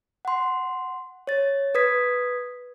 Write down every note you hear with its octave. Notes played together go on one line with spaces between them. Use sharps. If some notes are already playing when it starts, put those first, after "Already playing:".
F#5 C6
C#5 A6
B4 D#6 G#6 B6